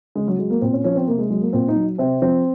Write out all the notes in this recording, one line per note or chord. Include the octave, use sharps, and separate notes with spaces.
C#3 G#3
F#3
F#3 G#3
A#3
A#2 C4
C#4
F3 C#4
C4
C3 A#3
G#3
F#3 G#3
A#3
A#2 C4
D#4
F#3
C3 C4
F3 C4